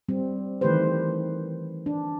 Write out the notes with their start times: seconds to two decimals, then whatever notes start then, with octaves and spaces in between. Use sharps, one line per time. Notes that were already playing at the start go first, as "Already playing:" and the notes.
0.09 G3 C4
0.61 D#3 E3 A3 G4 B4 C5
1.86 D4